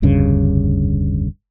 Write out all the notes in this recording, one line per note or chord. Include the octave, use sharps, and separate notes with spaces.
F1 D2 G2 C#3